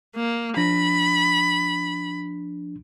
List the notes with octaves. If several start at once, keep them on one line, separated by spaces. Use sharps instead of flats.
A#3
F3 D4 B5 A#6